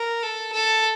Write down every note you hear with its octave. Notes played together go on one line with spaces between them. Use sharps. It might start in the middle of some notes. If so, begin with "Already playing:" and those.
Already playing: A#4
A4
A4